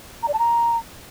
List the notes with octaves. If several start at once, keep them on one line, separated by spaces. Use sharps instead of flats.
A#5
D5
A5
A#5